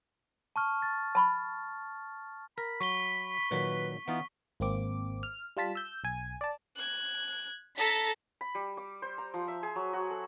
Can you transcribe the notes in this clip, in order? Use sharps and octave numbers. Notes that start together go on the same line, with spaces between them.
A5 C#6 F6
A6
A5 B5 C#6
A#4 B5
F#3 C#6 B6 G7
A#2 D#3 F#3 B4
E3 B3 D#4 F4
G#1 A#3 C4 D6
F6
G3 F4 A5 B6
E6 G6
B1 G#5
D5 A5
F#6 G#6
A4 A#5 A6 B6
B5
G3
D6
C5
A#5
F3
E5
G#4
F#3
F#4
A4